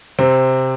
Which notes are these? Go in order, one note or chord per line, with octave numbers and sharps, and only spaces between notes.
C3 C4